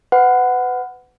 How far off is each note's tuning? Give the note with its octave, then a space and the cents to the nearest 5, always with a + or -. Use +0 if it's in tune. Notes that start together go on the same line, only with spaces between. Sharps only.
B4 +30 F#5 +0